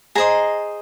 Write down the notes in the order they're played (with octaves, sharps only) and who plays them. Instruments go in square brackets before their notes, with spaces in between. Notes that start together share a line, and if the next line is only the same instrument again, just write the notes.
[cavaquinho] G#4 C5 D#5 A#5